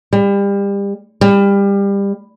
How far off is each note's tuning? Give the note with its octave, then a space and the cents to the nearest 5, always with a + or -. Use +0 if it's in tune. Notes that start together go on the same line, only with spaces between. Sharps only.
G3 +30
G3 +25